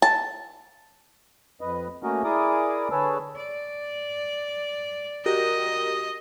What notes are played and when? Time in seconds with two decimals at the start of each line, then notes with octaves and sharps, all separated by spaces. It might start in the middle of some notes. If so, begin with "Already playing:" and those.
0.02 A5
1.61 F2 B4 D#5
2.03 A3 A#3 C#4 F#4 A#4 D#5
2.24 E4 G#4 A#4 D5 D6 D#6
2.91 D3 G#4 B4 C#5 A5 E6
3.37 D5
5.26 F#4 G4 A#4 D#5